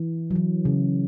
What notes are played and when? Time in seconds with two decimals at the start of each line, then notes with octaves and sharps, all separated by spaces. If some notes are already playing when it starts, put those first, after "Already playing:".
Already playing: E3
0.31 F#3
0.35 E3
0.65 C#3